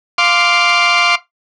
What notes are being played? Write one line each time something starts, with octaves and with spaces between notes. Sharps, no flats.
F5 C6 D6